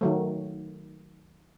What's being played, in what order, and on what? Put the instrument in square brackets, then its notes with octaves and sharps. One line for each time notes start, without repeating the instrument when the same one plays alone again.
[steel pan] D#3 F#3 A3